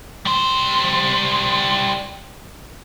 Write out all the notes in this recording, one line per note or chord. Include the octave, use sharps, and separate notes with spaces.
G3 C5